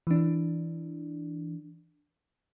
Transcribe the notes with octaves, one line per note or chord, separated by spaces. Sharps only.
E3 D4